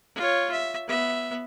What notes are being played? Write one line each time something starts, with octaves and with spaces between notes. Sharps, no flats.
F4 C#5
E5
B3 E5